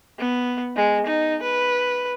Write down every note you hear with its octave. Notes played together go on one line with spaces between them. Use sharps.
B3
G#3
D#4
B4